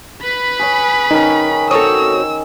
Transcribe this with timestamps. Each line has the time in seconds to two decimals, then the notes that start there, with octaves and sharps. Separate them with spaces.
0.22 B4 B5
0.59 G#4 C#5 G#5
1.11 D#3 C#4 D#4
1.71 C4 F#4 A4 C#5 D#6 E6